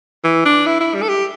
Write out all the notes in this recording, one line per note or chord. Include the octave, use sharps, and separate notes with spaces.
E3
D4
E4
E4
G3
A4
G4